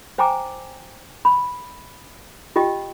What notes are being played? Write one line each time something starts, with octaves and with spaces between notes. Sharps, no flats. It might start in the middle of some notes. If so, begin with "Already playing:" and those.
C5 G5 G#5 A#5 D6
B5
F4 G4 D#5 G5